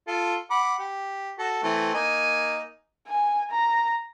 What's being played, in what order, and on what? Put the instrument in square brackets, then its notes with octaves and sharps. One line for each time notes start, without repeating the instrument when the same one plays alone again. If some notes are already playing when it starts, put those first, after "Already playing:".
[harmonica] F4 A4
F#5 B5 D6
G4
F#4 A4
E3 A3 C4
A#3 D#4 G#5
[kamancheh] G#5
A#5